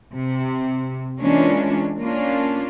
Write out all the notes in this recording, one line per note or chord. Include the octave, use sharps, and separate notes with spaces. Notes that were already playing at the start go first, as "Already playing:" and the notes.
C3
E3 G#3 A#3 C#4 D4 F4
A#3 C#4 D4 F4